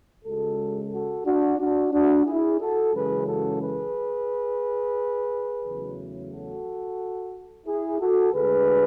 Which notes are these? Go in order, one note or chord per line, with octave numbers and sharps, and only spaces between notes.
C#2 C#3 G#3 F#4 A4
F#4 A4
D4 F#4
D4 F#4
D4 F#4
E4 G#4
F#4 A4
F#2 C#3 E3 G#3 G#4 B4
F#4 A4
G#4 B4
E2 C#3 F#3 A3
F#4 A4
E4 G#4
F#4 A4
D2 D3 G#3 G#4 B4